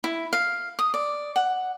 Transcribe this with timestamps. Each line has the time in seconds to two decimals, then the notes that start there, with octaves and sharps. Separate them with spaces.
0.04 E4
0.33 F5
0.79 D#6
0.94 D5
1.36 F#5